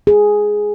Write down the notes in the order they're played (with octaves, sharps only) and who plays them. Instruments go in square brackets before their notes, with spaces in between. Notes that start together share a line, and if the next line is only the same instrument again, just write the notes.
[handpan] G#4